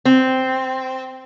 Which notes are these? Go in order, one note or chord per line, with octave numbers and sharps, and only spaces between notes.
C4